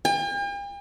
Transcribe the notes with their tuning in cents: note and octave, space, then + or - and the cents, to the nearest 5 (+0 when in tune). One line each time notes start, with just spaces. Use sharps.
G5 +45